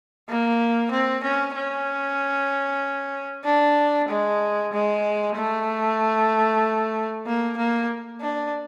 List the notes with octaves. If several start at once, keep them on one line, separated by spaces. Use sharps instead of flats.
A#3
C4
C#4
C#4
D4
G#3
G#3
A3
A#3
A#3
D4